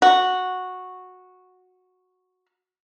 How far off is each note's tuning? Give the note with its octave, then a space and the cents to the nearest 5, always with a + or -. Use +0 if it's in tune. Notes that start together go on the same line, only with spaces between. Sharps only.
F#4 -10